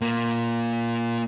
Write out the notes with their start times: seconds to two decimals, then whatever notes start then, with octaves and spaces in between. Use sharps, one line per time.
0.02 A#2 A#3